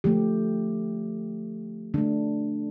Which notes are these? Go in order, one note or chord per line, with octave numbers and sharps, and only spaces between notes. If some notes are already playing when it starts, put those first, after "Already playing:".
D3 F3 A3 G4
D3 A3 D4